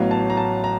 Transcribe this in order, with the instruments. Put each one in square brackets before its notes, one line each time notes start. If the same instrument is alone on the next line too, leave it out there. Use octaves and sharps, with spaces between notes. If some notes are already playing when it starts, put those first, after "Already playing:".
Already playing: [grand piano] A1 A2 F#3 B3 F5
A5
A#5
A5
A#5